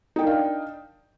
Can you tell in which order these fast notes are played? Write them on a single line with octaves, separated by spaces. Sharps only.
D#4 G5 A#4 D4 F5